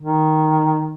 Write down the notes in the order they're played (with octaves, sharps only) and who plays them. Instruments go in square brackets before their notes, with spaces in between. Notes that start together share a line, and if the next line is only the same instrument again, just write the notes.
[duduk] D#3